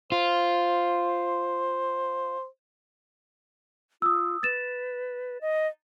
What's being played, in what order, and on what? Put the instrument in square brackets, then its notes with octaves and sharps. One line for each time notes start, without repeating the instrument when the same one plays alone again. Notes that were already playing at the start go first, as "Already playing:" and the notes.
[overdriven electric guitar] F4 [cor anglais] C5
[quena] F4 [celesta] D#6 E6
[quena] B4 [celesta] A6 E7
[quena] D#5